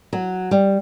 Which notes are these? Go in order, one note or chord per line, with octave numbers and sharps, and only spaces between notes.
F#3
G3